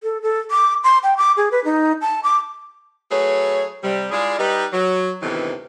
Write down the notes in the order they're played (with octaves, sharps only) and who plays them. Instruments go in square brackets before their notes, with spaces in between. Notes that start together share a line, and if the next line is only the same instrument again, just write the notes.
[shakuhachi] A4
A4
D6
C6
G5
D6
G#4
B4
D#4
A5
D6
[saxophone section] F#3 A3 G#4 B4 C#5
C3 G3
G#3 E4 F4 G#4 D5
G3 D#4 B4
F#3
D2 A2 C3 D#3 E3 B3